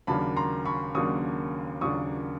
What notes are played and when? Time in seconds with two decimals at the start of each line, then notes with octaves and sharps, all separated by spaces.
0.07 D#2 C#3 F#3 A#3 D4 A5 B5
0.36 A#5 C6
0.65 B5 C#6
0.95 D#2 C#3 F#3 A#3 D4 C#6 D#6
1.81 D#2 C#3 F#3 A#3 D4 C#6 D#6